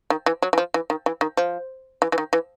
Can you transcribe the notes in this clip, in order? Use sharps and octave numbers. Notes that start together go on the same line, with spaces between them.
D#3
E3
F#3
E3
F3
E3
D#3
E3
D#3
F3
E3
E3
D#3
E3